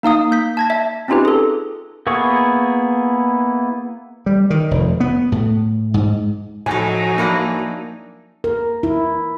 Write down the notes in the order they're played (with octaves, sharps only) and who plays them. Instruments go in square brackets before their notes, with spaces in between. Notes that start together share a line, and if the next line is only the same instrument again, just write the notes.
[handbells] A#3 D#4 F5 D#6
A#3 G6 B6
A5 G#6 A#6
E5 A5
C4 C#4 D#4 F4 G4 B4
G#4 A4
[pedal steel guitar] A#3 B3 E4 G#4 C#6
[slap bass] G3
D#3
F1
B3
A2
G#2
[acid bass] A2 [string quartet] F3 F#3 D#4 [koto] G#3 A4 [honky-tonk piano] G#5
[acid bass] A#3 [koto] D4 E4 A#4
[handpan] A#4
E4